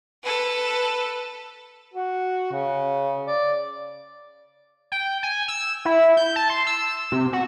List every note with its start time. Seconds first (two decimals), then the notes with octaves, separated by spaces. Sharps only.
0.23 A4 B4
1.94 F#4
2.52 C#3
3.26 D5
4.92 G5
5.23 G#5
5.48 E6
5.85 E4
6.17 G6
6.36 A5
6.50 C6
6.67 E6
7.12 C3
7.33 F#4